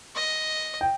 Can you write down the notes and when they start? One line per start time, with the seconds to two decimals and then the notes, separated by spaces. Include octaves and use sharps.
0.15 D#5
0.81 G5